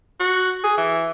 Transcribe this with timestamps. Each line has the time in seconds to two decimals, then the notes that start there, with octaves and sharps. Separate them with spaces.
0.20 F#4
0.64 G#4
0.78 E3